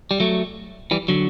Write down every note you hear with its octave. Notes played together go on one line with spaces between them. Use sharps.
G3
F#3 A3
E3 G3
D3 F#3